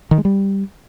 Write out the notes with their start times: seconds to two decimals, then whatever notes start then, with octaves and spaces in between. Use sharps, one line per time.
0.11 D#3
0.18 G#3
0.25 G3